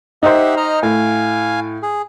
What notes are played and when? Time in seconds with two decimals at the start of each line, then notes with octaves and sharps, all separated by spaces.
0.23 D#4 G4 C5 E5 F#5
0.57 D#5 A#5 F6
0.83 A2 F5 G#5
1.83 G#4